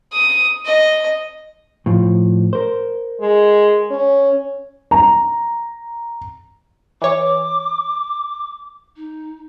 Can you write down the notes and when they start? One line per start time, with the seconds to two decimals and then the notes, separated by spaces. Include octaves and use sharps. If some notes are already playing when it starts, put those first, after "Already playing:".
0.13 D#6
0.65 D#5
1.86 A2 F3
2.53 A#4 C5
3.21 G#3
3.91 C#4
4.91 A#5
7.02 E3 C#5 D6
8.96 D#4